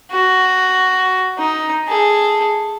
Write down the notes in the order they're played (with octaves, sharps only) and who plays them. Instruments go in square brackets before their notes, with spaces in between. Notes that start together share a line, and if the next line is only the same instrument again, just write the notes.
[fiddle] F#4
D#4
G#4 A4